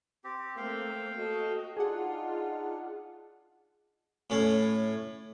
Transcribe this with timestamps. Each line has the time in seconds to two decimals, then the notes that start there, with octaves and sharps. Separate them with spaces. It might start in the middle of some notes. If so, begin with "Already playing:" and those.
0.24 C4 G4
0.57 A3 A#3 C4 F5 G5
1.17 F#4 A4 D#5
1.77 D4 D#4 F4 G#4 F#5
4.30 A2 C#4